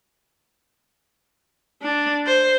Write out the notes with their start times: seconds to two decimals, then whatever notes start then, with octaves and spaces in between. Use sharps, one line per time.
1.83 D4
2.27 C5